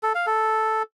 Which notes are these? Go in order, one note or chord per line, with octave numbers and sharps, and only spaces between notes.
A4
F5
A4